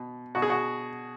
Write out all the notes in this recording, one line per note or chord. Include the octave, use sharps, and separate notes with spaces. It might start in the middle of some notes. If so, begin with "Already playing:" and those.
Already playing: B2
B2 F#4
G#4
F#4